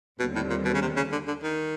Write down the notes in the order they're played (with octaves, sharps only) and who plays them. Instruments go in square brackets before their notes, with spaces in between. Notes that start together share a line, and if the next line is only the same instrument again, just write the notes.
[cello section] D#2 D3 G3 C4 [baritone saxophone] B2
[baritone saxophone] A2
A#2
B2
C#3
C3
C#3
D3
D3
D#3